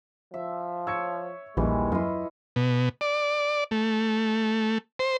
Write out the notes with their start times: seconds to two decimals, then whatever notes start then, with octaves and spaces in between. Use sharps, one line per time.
0.34 F3 E5
0.87 C#5 E6 G#6 C#7
1.57 A#1 D#2 E3 G3 G#3
1.92 F#2 E4 F4 D#5
2.56 B2
3.01 D5
3.71 A3
4.99 C5